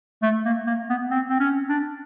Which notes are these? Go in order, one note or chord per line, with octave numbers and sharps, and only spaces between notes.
A3
A#3
A#3
B3
C4
C4
C#4
D4